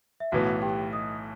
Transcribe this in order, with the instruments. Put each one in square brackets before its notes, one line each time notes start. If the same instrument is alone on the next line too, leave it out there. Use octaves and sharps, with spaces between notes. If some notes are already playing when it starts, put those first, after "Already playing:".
[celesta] E5
[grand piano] B1 A2 E3 B3 [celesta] F#4 F#5
[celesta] G4 G5
D#5 D#6